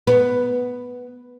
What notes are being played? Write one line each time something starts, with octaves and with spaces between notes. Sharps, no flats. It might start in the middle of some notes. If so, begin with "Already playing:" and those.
B3